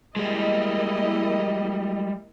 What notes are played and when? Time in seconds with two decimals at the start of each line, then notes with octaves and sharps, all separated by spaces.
0.16 G3 G#3 A#3 E4 D#5